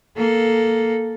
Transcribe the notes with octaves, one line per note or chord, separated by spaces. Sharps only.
A#3 A4